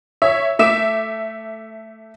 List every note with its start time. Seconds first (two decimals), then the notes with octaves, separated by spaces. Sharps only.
0.22 C#5 E5
0.59 A3 E5 D6 E7